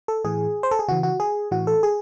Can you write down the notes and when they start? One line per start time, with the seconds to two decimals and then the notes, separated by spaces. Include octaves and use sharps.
0.08 A4
0.24 A2 E3 G#4
0.63 C5
0.71 A4
0.79 G#4
0.88 C#3 E3 F#4
1.03 F#4
1.20 G#4
1.51 A2 E3 F#4
1.67 A4
1.83 G#4